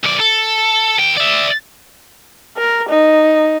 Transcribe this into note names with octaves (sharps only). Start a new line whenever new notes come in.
B1 D5
A4
D#2 G5
D5 E5
A#4
D#4